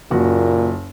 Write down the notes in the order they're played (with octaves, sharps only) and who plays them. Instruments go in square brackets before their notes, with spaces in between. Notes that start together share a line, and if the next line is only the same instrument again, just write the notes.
[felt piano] F#1 F#4 [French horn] A#2